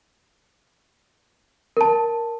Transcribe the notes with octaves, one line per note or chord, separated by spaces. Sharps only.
A#4 A5